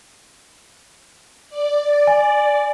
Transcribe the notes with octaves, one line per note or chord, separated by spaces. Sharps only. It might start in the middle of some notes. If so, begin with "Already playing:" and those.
D5
G#5